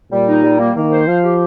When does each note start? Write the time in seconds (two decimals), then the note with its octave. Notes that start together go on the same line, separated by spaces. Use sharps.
0.11 A#2 G3
0.28 D#4
0.43 G3
0.59 A#3
0.76 D#3 A#3
0.92 C5
1.08 F3 F5
1.24 G4